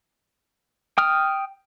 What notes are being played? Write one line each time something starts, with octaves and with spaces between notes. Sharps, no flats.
G5 D#6 F6